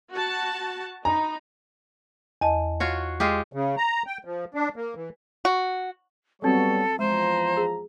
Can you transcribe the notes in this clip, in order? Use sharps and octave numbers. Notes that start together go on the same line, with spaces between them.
F#4 A5
D#4 A#5 B5
E2 D#5 A5
F4 F#4 C#5
G#3 F4 G4
C#3
A#5
G5
F3
D4
A#3
E3
F#4
F#3 G3 B3 C4 F#4 A4 C#5
E2 F3 G#3 C5 A#5
G#4